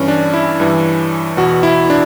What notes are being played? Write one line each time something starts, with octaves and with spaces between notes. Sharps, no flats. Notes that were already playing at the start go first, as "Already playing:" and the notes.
Already playing: G2 E3 C#4
D4
E4
G2 E3
E2 B2 F#4
E4
D4